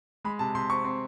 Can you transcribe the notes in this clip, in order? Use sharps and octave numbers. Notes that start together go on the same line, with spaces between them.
G#3 B5
C3 A5
C3 C6
C4 C#6
C4